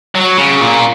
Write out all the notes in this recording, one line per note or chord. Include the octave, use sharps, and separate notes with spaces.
F#3
C#3
A#2